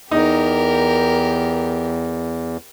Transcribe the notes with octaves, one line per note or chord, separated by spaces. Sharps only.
E2 D#4 G4 A#4